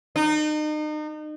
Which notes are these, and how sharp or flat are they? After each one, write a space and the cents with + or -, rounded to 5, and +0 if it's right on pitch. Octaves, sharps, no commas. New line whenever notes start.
D#4 -35